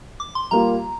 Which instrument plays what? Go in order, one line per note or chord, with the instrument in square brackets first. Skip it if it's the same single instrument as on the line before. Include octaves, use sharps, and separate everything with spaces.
[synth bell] D6
C6
[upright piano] G3 A#3 F4 [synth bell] A#5